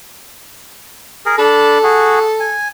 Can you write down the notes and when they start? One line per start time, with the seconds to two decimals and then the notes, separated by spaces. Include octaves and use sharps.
1.26 G#4 A#4
1.38 D4 A4 A5 B5
1.83 F#4 G#4
2.40 G#5